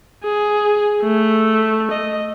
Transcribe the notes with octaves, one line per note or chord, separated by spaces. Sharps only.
G#4
A3
D#5